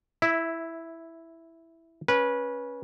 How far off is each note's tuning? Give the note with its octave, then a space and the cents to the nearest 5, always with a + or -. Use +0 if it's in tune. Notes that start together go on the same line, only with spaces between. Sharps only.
E4 +0 E5 -20
C#4 +0 B4 -20